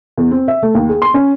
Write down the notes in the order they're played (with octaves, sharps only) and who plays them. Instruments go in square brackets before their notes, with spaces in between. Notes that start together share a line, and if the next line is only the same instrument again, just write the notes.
[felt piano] E2
C4
E5
A3
D#2
G#4
C6
C#4